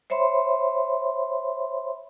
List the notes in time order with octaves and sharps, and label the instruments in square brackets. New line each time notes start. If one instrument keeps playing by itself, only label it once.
[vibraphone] C5 C#5 E5 B5 C6